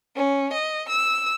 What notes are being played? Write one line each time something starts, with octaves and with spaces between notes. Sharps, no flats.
C#4
D#5
E6